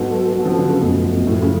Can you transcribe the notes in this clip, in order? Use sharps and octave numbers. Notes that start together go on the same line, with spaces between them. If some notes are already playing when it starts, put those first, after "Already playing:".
Already playing: G#2 F#3 B3 F#4 A4
F#3 B3 F#4 A4
F3
D3
C#3
F#2 B2 F3 A3
B2
F#2 A2 F3 A3
C#3